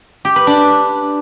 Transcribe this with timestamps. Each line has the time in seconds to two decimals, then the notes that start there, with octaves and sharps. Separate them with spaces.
0.25 G4
0.36 B4
0.47 D4